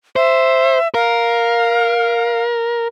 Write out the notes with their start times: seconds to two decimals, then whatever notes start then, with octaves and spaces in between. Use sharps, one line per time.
0.16 C5 E5
0.94 A#4 F5